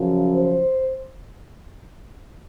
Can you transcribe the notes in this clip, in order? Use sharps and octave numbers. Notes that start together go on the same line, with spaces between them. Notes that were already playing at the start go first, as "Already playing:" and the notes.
Already playing: F#2 C#3 F3
C5